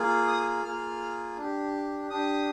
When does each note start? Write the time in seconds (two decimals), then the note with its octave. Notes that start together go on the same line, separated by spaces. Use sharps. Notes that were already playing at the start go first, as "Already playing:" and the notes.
Already playing: A#3 F4 G#4
0.28 D#6
0.64 A#3 F4 G#4 F6
1.37 D4
1.42 G4
2.10 D4 G4 D#6